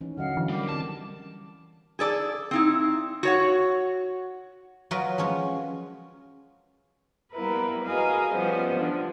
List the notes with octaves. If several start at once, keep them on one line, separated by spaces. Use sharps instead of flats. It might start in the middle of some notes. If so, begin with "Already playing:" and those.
E3 C#4 D#4
D3 F#3 D#5 F5 F#5 F6
E3
G3 A#4 D6
G3 C4 A5
G#4 A4 D5
C4 D#4 E4
F#4 C#5 F#5
F#3 F4 F#4 A#4 B4 D#5
F3 G#3 C#4 C#5
G3 A#3 B3 E4 A#4 B4
F#4 G#4 A#4 B4 D#5 F5
F3 G3 B3 C#4 C5 D#5
D3 E3 F3